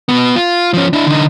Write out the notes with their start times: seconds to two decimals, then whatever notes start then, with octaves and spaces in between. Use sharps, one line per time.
0.09 B2 B3
0.36 F4
0.74 F3 C#4
0.93 D4 E4
1.07 D3 D#4